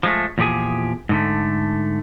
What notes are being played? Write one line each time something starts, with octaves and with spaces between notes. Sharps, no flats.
F3 G#3 A3
E2 A#2 F3 G4 G#4 G#5
G#2 D3 A3